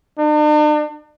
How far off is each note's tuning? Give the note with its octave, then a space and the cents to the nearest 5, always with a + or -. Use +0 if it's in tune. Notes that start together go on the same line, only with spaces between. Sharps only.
D4 +45